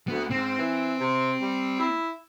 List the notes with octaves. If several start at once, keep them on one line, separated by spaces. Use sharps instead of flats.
D2 B3
G#2 C4
E3
C3
G3
E4